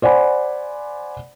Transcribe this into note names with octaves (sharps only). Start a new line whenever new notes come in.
C5 D5 F#5 G#5 B5